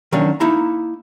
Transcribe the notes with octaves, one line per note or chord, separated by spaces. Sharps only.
D#3 F#3 A#3 C#4 D4
A#3 D#4 E4 A#5